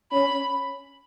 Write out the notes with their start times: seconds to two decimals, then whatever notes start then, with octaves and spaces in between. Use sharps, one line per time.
0.12 C#4 B5